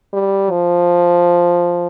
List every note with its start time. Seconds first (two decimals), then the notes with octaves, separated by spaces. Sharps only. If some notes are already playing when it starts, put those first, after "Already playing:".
0.13 G3
0.51 F3